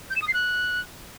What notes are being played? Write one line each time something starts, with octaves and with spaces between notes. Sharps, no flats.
G6
E7
D#6
C7
F#6